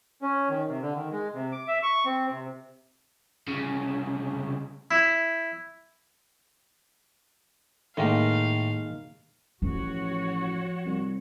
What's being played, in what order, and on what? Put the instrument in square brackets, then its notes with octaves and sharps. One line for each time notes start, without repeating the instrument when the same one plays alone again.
[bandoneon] C#4
D#3
C3
D3
D#3
G#3
C3
D6
E5
C#6
C4
C3
[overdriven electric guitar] C2 C#3
[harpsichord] E4
[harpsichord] A2 [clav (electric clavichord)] D#3 G#3 A#3 [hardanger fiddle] F5
[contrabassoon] A1 [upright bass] F3 [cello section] F#4 C#5
[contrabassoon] C2